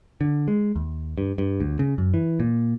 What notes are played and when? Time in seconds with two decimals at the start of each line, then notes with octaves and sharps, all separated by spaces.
0.21 D3
0.48 G#3
0.76 D#2
1.18 G2
1.38 G2
1.60 D2
1.79 C#3
1.98 F#2
2.14 E3
2.40 A#2